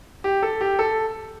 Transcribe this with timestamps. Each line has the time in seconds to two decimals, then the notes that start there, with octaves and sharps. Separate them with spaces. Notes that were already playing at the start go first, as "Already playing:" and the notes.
0.24 G4
0.43 A4
0.61 G4
0.79 A4